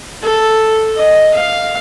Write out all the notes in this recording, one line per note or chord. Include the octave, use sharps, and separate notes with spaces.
A4
D#5
F5